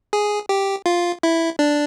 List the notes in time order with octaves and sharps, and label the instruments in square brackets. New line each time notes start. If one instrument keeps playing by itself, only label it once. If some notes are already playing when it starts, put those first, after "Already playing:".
[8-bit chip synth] G#4
G4
F4
E4
D4